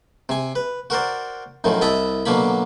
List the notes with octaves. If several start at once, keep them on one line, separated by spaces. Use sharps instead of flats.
C3 G#5
B4
F#4 A#4 C5 D5
F#2 A2 D#3 F3
C2 E4 D#5 A5 B5
B2 D3 F#3 A#3 B5